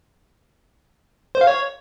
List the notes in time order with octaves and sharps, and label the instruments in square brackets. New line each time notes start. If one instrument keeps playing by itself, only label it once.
[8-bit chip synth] C5
F5
C#5